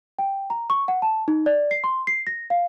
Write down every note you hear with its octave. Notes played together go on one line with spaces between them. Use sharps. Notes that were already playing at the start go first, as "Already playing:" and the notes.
G5
A#5
C#6
F#5
A5
D#4
D5
C7
C6
C7
A#6
F5